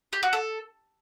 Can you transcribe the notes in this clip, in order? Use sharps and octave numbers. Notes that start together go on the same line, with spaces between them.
G4
F#4
A4